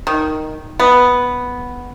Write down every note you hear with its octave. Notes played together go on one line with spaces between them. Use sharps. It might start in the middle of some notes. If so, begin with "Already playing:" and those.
D#3
B3